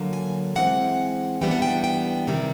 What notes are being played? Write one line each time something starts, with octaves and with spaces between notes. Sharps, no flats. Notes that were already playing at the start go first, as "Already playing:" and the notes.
Already playing: D3 F#3 A#3
G#5
E3 G#3 C4 F#5
E3 G3 B3 D4 G5
F#5
G5
G5
C3 D#3 G3